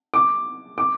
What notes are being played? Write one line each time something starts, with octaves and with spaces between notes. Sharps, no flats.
D6
D6